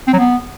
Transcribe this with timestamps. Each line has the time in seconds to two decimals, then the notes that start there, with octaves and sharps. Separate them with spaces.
0.08 C4
0.13 F#3
0.19 B3